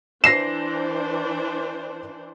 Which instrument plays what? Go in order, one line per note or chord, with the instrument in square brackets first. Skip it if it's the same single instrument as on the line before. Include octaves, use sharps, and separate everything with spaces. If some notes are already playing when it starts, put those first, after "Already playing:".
[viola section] E3 D4 C5 [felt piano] A#6 C7 E7